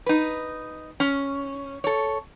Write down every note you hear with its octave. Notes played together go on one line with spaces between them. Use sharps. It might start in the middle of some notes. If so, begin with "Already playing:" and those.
D#4 B4
C#4
A4 C#5